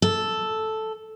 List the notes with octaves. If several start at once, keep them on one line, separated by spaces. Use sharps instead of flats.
A4